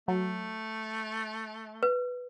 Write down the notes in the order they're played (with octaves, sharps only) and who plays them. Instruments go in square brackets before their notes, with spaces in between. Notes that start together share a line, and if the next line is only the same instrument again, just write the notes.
[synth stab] F#3 [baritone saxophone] A3
[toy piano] B4